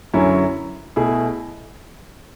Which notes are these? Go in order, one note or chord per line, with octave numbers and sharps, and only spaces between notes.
F#2 D3 F#3 C#4 E4
B2 A3 E4 G#4